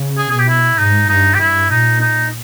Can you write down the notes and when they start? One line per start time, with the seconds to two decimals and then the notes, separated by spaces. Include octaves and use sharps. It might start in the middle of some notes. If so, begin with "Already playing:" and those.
Already playing: C#3
0.18 G#4
0.31 B2 G#4
0.39 G4
0.48 E4
0.78 G#2 D#4
1.09 G2 D#4
1.34 G4
1.40 G2 E4
1.70 A#2 D#4
2.00 D#4